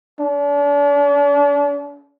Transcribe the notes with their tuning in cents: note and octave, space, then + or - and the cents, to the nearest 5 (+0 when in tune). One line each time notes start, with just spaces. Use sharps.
D4 -40